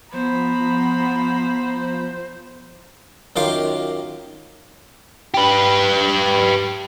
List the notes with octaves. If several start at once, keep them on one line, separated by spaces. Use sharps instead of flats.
F3 B3 C5 A#5 B5
F#2 D#3 F4 G4 F5 D6
G4 B4